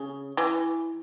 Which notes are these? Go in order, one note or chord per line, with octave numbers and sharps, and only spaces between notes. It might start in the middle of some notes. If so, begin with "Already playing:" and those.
Already playing: C#3
E3